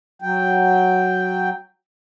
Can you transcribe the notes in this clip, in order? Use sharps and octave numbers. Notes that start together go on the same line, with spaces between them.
F#3 G5